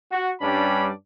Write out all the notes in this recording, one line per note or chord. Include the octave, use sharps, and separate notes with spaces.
F#4
G2 G3 C#4 D4 D5 B5